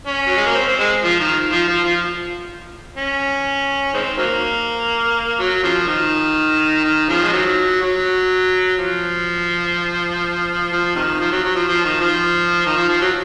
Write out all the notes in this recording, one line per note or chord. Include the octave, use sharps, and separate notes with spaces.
C#4
F#3
G#3
A#3
C4
C4
G#3
F3
D#3
F3
F3
F3
C#4
D#3 G#3 C4
D#3 F#3 A#3
F#3
C#3 F3
D#3
D#3
C#3 F3
G#3
D#3 F#3
F#3
F3
F3
C3 D#3
F3
F#3
F#3
F3
F3
D#3
F3
D#3
F3
F3
F#3